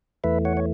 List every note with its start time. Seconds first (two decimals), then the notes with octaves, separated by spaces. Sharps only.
0.24 E2 E3 A3 B4 E5
0.45 C#5 F#5
0.57 C#5